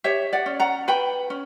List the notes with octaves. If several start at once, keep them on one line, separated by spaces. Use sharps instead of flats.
G4 C#5 E5
D5 F#5
C#4
F#5 A#5
B4 G5 B5
C#4